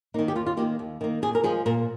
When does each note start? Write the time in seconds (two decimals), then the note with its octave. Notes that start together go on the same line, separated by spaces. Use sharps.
0.14 A#3 D#4
0.19 D#3
0.28 G4
0.35 D#2 F4
0.46 F4
0.57 D#3 A#3 G4
0.79 D#2
1.01 D#3 A#3
1.22 A#2 G#4
1.35 A#4
1.44 F3 G#3 G#4
1.66 A#2 A#4